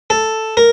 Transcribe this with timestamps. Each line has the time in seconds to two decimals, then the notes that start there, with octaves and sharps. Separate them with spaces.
0.10 A4
0.57 A#4